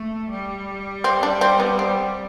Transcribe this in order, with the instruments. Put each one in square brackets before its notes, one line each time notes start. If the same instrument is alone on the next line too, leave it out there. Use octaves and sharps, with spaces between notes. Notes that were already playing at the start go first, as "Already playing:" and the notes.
Already playing: [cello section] A3
G3
[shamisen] C4
D4
C4
B3
C4